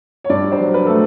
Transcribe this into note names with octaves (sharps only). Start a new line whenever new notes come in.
C#5
G2 D5
C5
F#3
B4
A3 A4